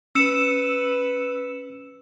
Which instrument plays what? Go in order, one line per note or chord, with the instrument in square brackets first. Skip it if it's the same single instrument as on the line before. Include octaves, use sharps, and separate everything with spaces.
[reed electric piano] C#4 [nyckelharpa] B4 [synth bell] E6 C#7 E7